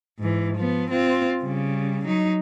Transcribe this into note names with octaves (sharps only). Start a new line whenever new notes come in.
G#2 E3
F3 B3
C4 F4
C#3 G3
F#3 D#4